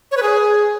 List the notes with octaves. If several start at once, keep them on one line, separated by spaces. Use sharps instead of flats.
C#5
B4
G#4